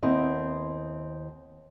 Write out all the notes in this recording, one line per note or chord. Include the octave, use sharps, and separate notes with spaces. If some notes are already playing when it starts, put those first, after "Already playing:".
D#2 B3 C4 E4 D#5